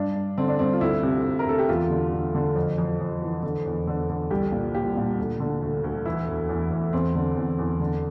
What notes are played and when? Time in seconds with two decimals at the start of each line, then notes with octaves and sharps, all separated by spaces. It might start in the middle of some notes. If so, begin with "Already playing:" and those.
Already playing: G2 D4
0.15 G2
0.38 D3 C4
0.48 D4
0.59 G2 C4
0.73 F4
0.81 D2 E4
1.03 C3
1.25 D2
1.39 A#4
1.46 D2 A4
1.59 G4
1.69 E2 F4
1.90 D3
2.13 D3
2.35 D3
2.56 F2
2.78 F2
3.00 F2
3.22 E3
3.43 D3
3.66 E2
3.87 D3
4.10 D3
4.30 C2 G4
4.52 A#2
4.75 A#2 G4
4.97 A#2
5.18 D2
5.40 D3
5.62 D2
5.84 D2
6.05 E3 E4
6.27 E2
6.49 E2
6.72 E2
6.93 E2 C4
7.15 D3
7.36 E2
7.59 E2
7.80 D3